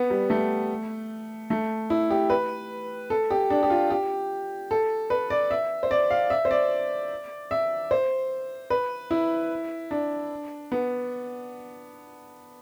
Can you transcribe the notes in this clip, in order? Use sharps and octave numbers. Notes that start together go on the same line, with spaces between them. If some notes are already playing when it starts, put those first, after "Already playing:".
Already playing: B3
G3
A3
A3
E4
G4
B4
A4
G4
D4
G4
F4
G4
A4
B4
D5
E5
C5
D5
F5
E5
C5
D5
E5
C5
B4
E4
D4
B3